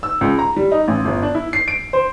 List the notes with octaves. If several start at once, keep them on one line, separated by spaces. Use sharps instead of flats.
E6
C#2
A#5
G3
D#4
A1
G1
D4
E4
C7
D7
C5